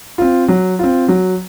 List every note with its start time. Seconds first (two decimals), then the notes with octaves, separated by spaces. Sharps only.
0.18 C4 F4
0.48 F#3
0.79 C4 F4
1.09 F#3